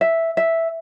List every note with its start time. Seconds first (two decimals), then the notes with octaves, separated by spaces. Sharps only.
0.01 E5
0.37 E5